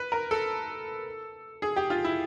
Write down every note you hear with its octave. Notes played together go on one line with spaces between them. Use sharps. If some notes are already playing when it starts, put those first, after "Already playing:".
Already playing: B4
A#4
A4
G#4
G4
F4
E4